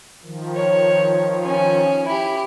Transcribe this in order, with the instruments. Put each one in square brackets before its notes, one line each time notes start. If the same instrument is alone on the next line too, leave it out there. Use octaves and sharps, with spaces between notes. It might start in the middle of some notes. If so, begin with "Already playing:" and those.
[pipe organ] D#3 F3
[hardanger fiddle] C#5
C#4 G#5
E4 G4